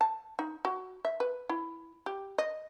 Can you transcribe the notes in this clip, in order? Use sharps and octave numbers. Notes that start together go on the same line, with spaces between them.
A5
D#4
F#4
E5
B4
E4
G4
D#5